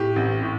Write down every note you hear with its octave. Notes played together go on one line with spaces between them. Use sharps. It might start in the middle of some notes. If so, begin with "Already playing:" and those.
Already playing: A2 G4
A1
A2